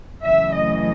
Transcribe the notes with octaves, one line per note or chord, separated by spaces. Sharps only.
F#2 C#3 E3 A3 E5
D#5